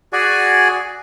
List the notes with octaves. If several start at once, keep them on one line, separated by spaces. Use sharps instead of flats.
F#4 G#4 D5 G#5